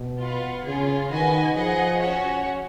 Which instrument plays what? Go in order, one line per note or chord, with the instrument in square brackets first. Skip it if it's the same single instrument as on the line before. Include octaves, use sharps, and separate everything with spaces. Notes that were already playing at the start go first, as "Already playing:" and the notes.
Already playing: [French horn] B2
[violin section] F4 B4 F#5
[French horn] C#3 [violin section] C#4 F4 G#4
[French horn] D#3 [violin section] F#4 B4 D#5 G#5
[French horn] F3 [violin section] G#4 D#5 F#5
[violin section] C#4 F#4 C#5 F#5